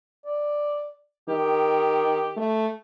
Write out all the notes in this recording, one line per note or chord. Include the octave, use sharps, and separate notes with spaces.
D5
D#3 G4
A3